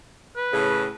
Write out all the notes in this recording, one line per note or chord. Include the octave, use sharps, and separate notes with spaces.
B4
A2 C#3